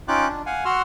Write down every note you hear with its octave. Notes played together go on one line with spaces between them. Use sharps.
C#4 D#4 F4 G5 D6 F#6
D4
F5 F#5 G#5
F#4 F#5 C6 E6 F6